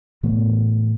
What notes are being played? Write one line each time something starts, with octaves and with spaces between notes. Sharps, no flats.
A2 E3 A3 B3